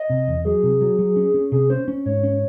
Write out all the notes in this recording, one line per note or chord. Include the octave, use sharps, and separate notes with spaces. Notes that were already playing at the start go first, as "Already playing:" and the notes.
Already playing: D#5
C3
E2
F#3 G#4
C3
F#3
F#3
C#4
C#4
C3 G#4
C#4 C5
C#4
G#2 C#5
C#4